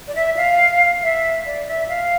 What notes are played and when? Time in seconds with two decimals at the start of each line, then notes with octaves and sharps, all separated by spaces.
0.08 D5
0.15 E5
0.37 F5
1.02 E5
1.46 D5
1.67 E5
1.88 F5